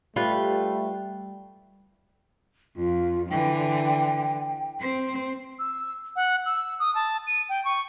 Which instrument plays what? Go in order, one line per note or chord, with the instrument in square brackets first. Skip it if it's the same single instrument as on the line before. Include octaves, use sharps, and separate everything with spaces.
[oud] G3 [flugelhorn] A3 [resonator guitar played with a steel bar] F4 B4
[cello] F2 [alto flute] F4
[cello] D3 E3 [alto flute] G5
[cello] C4 C5
[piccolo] E6
F#5
E6
D#6
A5
D#7
G5
C#6